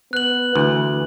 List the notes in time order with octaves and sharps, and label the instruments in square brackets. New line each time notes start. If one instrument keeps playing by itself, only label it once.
[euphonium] B3 [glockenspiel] F#6 F#7
[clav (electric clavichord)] D2 [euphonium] E3